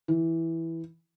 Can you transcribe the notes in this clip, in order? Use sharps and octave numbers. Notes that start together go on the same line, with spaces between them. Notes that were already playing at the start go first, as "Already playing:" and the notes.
E3